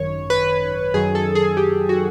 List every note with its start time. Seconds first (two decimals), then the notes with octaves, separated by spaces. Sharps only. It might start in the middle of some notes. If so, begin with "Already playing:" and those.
Already playing: G#1 F#2 D#3 C#5
0.30 B4
0.94 F#2 D#3 F#3 G#4
1.15 A4
1.35 G#4
1.57 G4
1.89 F#4